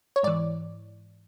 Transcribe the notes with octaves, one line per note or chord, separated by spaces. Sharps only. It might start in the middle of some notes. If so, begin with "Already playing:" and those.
C#5
G#2 E3 D5